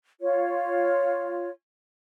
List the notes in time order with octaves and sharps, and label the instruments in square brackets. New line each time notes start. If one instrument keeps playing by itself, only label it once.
[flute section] F4 C#5